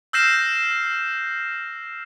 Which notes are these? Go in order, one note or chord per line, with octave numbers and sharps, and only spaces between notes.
E6 F6 G6 A#6 C7 E7